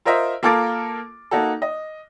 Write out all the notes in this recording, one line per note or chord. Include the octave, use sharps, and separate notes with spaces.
F4 A#4 C5 D#5 E5
A#3 F4 A4 A#4 D6 A6
A#3 D#4 F#4 A4
D#5